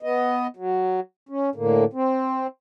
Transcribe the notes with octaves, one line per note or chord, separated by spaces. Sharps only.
B3 D#5
F#3
C#4
A2 D3 A#3
C4